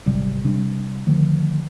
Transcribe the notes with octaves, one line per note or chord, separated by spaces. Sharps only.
G#1 C3 F#3 G3
C3 G3 D4
D3 D#3 F3 A3